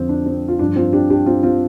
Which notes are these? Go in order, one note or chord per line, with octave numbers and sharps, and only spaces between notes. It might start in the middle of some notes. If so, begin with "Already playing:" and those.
Already playing: F2 D3 F3 C4
D4
C4
F4
G2 F3 D4
C4 F4
D4 G4
D4 G4
C4 F4
C4 F4